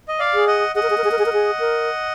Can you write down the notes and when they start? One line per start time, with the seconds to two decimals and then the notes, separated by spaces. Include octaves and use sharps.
0.08 D#5
0.20 D5 F5
0.34 G#4
0.47 D#5 F#5
0.75 G#4 D#5 F#5
0.83 A#4
0.90 G#4
0.98 A#4
1.04 G#4
1.11 A#4
1.19 G#4
1.26 A#4
1.33 G#4
1.59 A#4